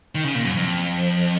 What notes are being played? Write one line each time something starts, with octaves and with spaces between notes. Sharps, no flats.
D#3
C#3
A#2
F#2
F2